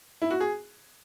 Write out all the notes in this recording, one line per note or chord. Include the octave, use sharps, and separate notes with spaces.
E4
F#4
G#4